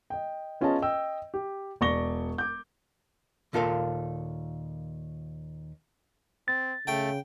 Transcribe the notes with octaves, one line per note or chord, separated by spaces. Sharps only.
D#5 G5
B3 C#4 F4 G#4 D#5 A5
D#5 G5 E6
G4
E1 D5 C#6 A#6 G7
D6 G6
D#2 A#2 F4 A4 A#4 F5
C4 A6
C#3 A3 G5